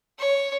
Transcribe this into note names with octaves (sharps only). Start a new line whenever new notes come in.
C#5